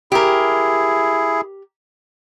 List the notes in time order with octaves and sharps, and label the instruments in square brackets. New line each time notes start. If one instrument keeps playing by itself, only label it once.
[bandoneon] E4 G#4 [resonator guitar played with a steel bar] G4 A#4